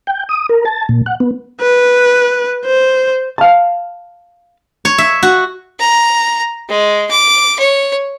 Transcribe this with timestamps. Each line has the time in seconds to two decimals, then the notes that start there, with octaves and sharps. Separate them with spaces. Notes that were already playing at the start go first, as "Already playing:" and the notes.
0.07 G5
0.29 D#6
0.49 A#4
0.65 A5
0.89 A#2
1.06 F#5
1.20 B3
1.61 B4
2.66 C5
3.38 F5 A5
4.85 C#5
4.98 E5
5.23 F#4
5.79 A#5
6.69 G#3
7.11 D6
7.59 C#5